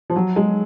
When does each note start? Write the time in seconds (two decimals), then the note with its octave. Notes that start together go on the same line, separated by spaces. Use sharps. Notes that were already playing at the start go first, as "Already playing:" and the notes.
0.10 F3
0.16 F#3
0.36 G#3